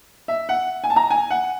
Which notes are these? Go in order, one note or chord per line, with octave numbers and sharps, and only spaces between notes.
E5
F#5
G#5
A5
A#5
G#5
F#5